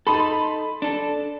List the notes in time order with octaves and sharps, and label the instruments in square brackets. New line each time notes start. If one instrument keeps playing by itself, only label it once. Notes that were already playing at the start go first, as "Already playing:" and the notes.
[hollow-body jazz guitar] D#4 A4 [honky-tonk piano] B5 C6 A6
[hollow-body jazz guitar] D4 A4